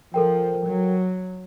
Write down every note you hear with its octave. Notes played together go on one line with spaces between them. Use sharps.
F3 A4 A#4 G5
F#3